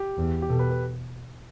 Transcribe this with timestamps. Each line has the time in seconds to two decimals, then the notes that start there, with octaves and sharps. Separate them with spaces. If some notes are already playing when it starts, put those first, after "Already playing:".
Already playing: G4
0.18 E2
0.42 G4
0.49 B2 A4
0.59 B4
0.70 B4